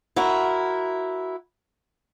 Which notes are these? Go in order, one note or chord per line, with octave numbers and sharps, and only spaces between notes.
E4 F#4 A#4